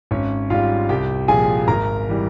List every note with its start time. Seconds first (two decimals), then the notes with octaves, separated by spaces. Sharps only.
0.11 G#1 C#4 C#5
0.50 G#2 G3 F4 F5
0.89 C2 G4 G5
1.28 A#2 F3 G#4 G#5
1.68 G#1 A#4 A#5
2.09 E3 G3